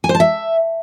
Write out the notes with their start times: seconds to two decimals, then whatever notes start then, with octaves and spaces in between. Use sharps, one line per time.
0.04 G#5
0.09 C5
0.15 A5
0.20 E5